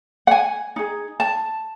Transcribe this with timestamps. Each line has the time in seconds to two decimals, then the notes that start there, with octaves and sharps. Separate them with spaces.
0.27 F#5
0.31 G#5
0.76 D#4 G#4
1.20 A5